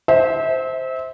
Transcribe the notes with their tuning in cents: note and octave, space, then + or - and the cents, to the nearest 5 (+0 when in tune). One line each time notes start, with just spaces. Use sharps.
C5 +0 E5 -30